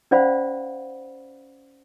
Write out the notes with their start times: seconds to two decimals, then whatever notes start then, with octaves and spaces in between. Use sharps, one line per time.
0.11 C#4 C5 D5 F5 F#5 B5